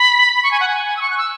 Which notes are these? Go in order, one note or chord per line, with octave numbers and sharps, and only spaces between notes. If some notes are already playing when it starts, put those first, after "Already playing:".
Already playing: B5
B5
C#6
G#5
F#5
G#5
G#5
E6
C#6
F#6
E6